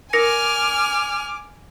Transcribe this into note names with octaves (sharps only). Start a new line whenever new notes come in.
A#4 G#5 D6 F6 A#6 C#7